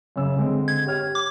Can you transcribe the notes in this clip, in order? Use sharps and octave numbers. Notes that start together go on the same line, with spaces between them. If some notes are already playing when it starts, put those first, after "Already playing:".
F#2 C#3 E6
D3 G#3 C4
G#6
G4 C#5 F6
D6